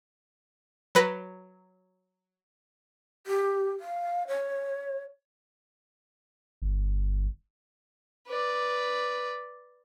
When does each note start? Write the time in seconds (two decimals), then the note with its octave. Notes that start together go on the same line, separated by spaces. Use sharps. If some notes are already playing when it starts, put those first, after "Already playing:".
0.95 F#3 B4 A#6
3.27 G4
3.80 F5
4.28 C#5
6.62 G1
8.28 B4 D5